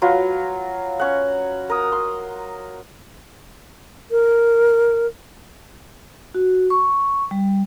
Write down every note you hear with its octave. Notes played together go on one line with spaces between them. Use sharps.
F#3 F4 B4
C#4 F#5
A#4 D#6
C6
A#4
F#4
C#6
G3